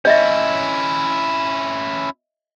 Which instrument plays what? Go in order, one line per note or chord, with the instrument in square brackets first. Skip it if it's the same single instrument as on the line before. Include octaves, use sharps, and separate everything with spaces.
[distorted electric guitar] C#4 E4 [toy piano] C#5 D#5 E5